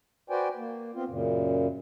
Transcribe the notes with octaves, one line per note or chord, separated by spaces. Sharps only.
F#4 B4 C5 D5 G5 G#5
A#3
B3 C4 F4
F#2 A#2 C#3